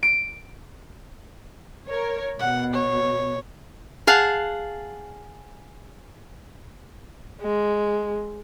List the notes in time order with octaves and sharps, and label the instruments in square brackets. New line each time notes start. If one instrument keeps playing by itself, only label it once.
[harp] D7
[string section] A#4 C#5
[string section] B2 [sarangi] F#5
[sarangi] C#5
[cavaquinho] G#4 F5 F#5 A5
[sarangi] G#3